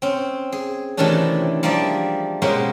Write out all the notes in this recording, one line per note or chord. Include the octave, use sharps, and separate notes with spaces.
C4 C#4
G#4
C3 D#3 E3 A3 C#4 D4
F3 G3 A#3 G#4 D5 E5
B2 G#3 A#3 C#4 G4 C5